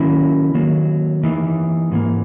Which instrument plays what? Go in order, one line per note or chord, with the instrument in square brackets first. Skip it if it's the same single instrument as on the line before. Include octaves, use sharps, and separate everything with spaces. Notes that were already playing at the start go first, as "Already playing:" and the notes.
Already playing: [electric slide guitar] D#3 F#3 A#3 C#4 E4
D#3 F#3 A#3
E3 A#3 D#4
G#2 E3 A#3